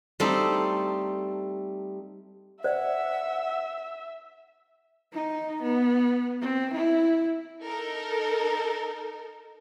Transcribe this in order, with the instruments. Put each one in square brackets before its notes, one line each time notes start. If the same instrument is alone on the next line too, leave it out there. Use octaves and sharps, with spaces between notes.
[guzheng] G3 A3 C4 D#4 G4 A4
[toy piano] C5 D5 [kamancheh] E5 [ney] F#5
[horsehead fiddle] D#4
B3
C4
E4
[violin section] D#4 A4 A#4